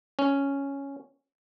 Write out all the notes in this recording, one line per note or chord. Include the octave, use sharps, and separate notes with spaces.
C#4